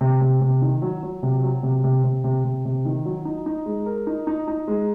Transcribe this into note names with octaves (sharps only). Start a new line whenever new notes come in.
C3
C3
C3
D#3
F#3
F#3
C3
F#3
C3
C3
C3
C3
C3
C3
D#3
F#3
D#4
D#4
G#3
A#4
D#4
D#4
D#4
G#3